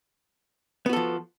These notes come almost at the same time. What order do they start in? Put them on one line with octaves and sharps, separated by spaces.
B3 F#4 A4 F3